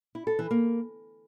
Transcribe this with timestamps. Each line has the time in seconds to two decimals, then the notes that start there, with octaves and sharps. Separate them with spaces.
0.15 E4
0.27 A4
0.39 E3
0.51 A#3